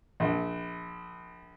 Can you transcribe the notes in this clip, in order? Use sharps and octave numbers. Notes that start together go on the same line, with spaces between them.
A#1